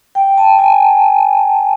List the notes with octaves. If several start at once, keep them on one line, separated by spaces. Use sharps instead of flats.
G5
A5
G#5